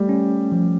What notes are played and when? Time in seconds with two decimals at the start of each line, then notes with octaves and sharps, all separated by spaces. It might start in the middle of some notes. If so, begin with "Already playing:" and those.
Already playing: G3 A3 G4
0.09 C#4
0.52 F3